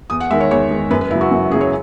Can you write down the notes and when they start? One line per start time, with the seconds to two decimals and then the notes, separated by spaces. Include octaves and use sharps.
0.10 E2 D#6
0.20 F#5
0.30 D#3 G#3 E5
0.40 C#5
0.51 E2 C#5
0.71 D#3 G#3
0.90 F#2 B4
1.01 B4
1.10 C#3 E4
1.15 F#3
1.21 F#4
1.31 F#2
1.50 C#3 G#4
1.55 F#3
1.61 C#5